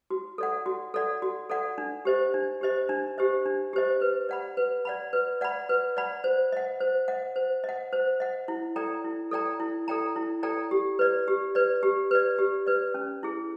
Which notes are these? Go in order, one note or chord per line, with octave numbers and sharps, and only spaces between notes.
F#4
A4 D5 F#5
F#4
A4 D5 F#5
F#4
A4 D5 F#5
D4
G4 C5 D#5
D4
G4 C5 D#5
D4
G4 C5 D#5
D4
G4 C5 D#5
B4
D5 F#5 B5
B4
D5 F#5 B5
B4
D5 F#5 B5
B4
D5 F#5 B5
C5
D#5 F#5
C5
D#5 F#5
C5
D#5
F#5
C5
D#5 F#5
E4
A4 D5 G5 A#5
E4
A4 D5 G5 A#5
E4
A4 D5 G5 A#5
E4
A4 D5 G5 A#5
G4
B4 D5
G4
B4 D5
G4
B4 D5
G4
B4 D5
C#4
E4 G#4